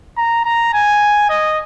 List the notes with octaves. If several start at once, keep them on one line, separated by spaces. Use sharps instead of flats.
A#5
A#5
G#5
D#5